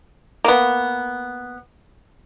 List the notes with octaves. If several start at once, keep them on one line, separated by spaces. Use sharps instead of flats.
A#3 B3